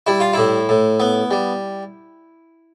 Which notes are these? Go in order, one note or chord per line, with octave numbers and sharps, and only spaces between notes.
G3 E4
F4
A2 E4
A2
B3
G3